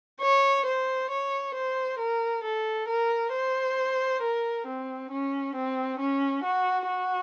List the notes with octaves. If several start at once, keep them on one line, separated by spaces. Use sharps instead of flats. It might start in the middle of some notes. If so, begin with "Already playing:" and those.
C#5
C5
C#5
C5
A#4
A4
A#4
C5
A#4
C4
C#4
C4
C#4
F#4
F#4